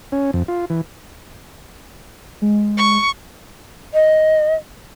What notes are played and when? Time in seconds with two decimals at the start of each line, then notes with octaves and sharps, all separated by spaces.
0.12 C#4
0.33 F2
0.48 F4
0.70 E3
2.42 G#3
2.77 C#6
3.94 D#5